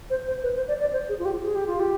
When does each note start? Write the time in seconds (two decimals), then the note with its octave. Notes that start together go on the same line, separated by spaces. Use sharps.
0.10 C5
0.27 C5
0.43 B4
0.56 C5
0.68 D5
0.80 D5
0.93 C5
1.09 G#4
1.19 F4
1.25 G4
1.43 G#4
1.55 G4
1.67 F4
1.80 G4